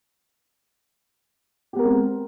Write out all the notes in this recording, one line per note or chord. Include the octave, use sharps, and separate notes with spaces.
G#3 B3 C4 G4 A#4